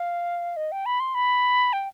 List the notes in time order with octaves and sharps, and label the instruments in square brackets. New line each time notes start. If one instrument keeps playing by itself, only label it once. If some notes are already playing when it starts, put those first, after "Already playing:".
Already playing: [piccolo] F5
D#5
G5
B5
C6
B5
G5